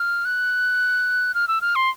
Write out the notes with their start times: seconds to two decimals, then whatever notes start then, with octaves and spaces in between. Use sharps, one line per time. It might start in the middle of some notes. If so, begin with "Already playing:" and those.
Already playing: F6
0.25 F#6
1.35 F6
1.48 E6
1.61 F6
1.76 C6